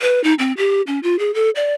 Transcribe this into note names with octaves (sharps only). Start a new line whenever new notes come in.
B4
D#4
C4
G4
C#4
F4
G#4
A4
D5